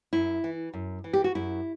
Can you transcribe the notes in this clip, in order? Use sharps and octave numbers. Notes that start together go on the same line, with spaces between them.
F#2 E4
E3
F#2
E3
G4
F#4
F#2 E4